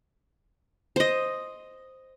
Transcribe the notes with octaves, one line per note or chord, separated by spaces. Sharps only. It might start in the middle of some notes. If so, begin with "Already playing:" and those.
C5 D#5